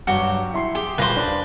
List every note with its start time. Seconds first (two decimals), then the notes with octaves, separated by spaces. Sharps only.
0.07 G2 F#3 F#4 G4
0.54 E4 C6 C7
0.75 G4 G#4
0.98 D#1 B4 C5 F5 A#6
1.17 D4